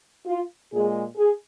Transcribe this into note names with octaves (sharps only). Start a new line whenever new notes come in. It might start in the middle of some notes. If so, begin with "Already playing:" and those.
F4
A#2 G#3 G#4
G#4